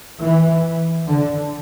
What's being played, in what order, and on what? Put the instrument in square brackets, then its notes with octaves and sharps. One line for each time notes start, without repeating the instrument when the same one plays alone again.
[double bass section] E3
D3